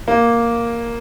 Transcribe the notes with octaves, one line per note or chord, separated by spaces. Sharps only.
A#3